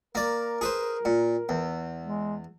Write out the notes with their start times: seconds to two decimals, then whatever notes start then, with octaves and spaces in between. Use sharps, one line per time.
0.15 A#3 A#4 D5
0.61 G#4 B4 C5
1.05 A#2
1.49 E2
2.01 G#3